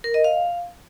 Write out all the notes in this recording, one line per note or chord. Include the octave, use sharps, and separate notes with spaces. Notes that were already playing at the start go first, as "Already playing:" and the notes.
A#4
D#5
F5